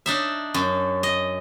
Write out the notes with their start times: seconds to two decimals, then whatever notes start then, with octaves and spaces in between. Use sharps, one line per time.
0.06 D4 D#4 E5
0.54 F#2
1.03 D#5